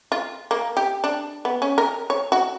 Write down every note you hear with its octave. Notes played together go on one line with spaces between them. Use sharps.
F4
A#3
G4
D4
B3
C#4
A#4
C#5
F#4